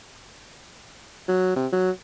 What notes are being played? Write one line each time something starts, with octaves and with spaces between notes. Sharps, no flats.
F#3
C3
F#3